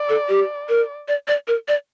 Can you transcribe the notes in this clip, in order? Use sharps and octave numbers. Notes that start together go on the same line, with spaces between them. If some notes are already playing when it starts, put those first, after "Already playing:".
Already playing: D5
A4
G4
A#4
D5
D5
A#4
D5